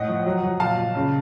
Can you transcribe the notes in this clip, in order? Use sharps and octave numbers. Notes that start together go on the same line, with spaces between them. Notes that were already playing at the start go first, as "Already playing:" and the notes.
Already playing: A2 D#5 F#5
F3
F#3
F#3
A#2 F5 A5
A#2
C#3